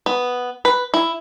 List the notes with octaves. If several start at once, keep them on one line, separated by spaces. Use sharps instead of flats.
B3
B4
E4